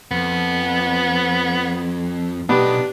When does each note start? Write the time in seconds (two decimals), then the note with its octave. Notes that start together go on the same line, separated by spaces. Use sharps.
0.11 F2 B3
2.49 B2 B3 D4 D#4 G4